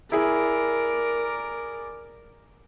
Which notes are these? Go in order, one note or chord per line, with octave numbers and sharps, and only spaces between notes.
E4 G#4 A#4 D5